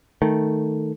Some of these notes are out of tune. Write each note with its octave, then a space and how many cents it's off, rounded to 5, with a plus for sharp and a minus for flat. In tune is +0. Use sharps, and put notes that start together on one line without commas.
D#3 +0 A3 +0